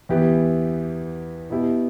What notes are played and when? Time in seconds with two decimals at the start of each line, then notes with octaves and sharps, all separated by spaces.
0.09 E2 E3 B3 G4
1.50 B2 B3 E4 G4